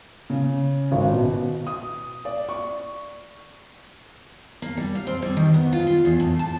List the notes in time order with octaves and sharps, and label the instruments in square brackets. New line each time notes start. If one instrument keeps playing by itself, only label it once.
[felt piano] C#3
G#1
B2
D#6
D5
C#6
[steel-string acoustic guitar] A#3
G3
F5
C4
G3
D#3
B3
F4
F4
E2
A2
A5